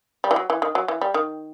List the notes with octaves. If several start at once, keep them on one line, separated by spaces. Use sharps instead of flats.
G3
E3
F#3
E3
D#3
F#3
E3
G3
D#3